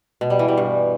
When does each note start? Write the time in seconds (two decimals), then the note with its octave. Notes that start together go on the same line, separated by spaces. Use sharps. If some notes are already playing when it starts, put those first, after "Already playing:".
0.21 B2
0.30 G3
0.39 E3
0.48 G3
0.58 G2